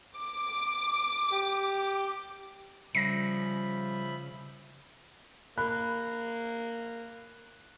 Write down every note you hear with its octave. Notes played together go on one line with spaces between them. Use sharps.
D6
G4
C#3 F3 G3 E5 B5 A#6 C7
A#3 B5 F#6